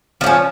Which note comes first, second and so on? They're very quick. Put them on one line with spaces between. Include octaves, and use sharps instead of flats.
F3 A#3 C#4